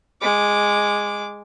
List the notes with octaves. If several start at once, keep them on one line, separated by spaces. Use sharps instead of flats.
G#3 D6